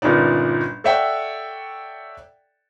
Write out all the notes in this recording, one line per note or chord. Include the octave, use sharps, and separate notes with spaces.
G1 A#2 C#4 D#4 D5
A4 C#5 D5 E5 F#5 G5